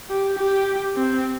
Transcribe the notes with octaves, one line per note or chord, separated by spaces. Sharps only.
G4
G4
C4